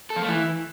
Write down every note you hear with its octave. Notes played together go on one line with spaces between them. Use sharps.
A4
F3
A3
E3